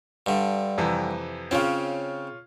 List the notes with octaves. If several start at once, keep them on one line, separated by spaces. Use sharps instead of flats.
G2 D3
F2 C3 E3
C#3 C4 C#4 F4